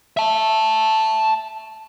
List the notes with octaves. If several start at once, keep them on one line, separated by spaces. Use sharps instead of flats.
E5 A5